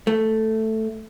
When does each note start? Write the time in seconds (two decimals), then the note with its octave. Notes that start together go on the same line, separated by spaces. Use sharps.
0.07 A3